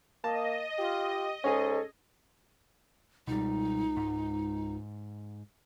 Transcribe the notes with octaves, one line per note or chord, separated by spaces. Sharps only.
A#3 D#5 A5
F4 G4
G#2 C#4 G#4 A4
C#2 B2 G3 D#4
G#2